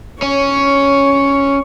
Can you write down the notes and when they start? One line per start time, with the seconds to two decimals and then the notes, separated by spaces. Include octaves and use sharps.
0.22 C#4 C#5